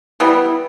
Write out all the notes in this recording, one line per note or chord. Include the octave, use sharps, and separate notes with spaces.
E3 G3 B3